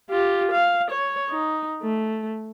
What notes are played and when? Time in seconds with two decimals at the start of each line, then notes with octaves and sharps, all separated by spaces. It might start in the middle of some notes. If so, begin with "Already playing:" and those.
0.10 F4 G4
0.52 F5
0.91 C#5
1.29 D#4
1.83 A3